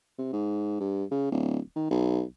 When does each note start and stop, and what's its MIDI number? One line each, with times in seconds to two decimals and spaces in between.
0.18 0.28 48
0.33 0.79 44
0.80 1.04 43
1.11 1.28 49
1.31 1.58 26
1.76 1.88 51
1.90 2.22 35